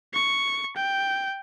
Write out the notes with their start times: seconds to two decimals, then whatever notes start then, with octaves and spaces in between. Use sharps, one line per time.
0.13 C#6
0.76 G5